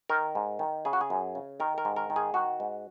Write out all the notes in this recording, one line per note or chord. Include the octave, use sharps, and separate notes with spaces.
D#3 A#4
G#2
D#3
C#3 G#4
F#4
G#4
F#2
C#3
D#3 A#4
A#4
G#2
A#4
D#3
G#4
D#3 F#4
G#2